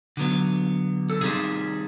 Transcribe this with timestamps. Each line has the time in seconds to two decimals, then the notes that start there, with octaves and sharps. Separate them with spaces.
0.17 D3 F#3 B3
1.10 A4
1.21 C3 D#3 G3 C4 G#4